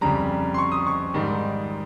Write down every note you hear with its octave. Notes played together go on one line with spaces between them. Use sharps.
F2 C#3 G3 A#5
C6
C#6
D#6
C#6
G#2 D#3 G3